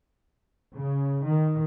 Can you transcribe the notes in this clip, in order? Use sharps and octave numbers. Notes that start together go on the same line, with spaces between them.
C#3
D#3